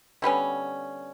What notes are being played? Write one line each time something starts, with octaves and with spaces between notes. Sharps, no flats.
D3 G3 B3 C#4